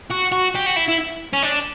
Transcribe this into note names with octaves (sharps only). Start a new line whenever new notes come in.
F#4
F#4
G4
F#4
E4
E4
C#4
D4